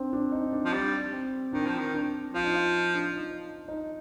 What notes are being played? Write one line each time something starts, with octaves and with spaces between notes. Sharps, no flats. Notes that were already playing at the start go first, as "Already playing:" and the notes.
Already playing: C4 D4
D4
D#4
D4
F3
G3
C4
D#3 D4
F3
D#3
D4
F3 F4
D#4
F4
D4
D#4
D#4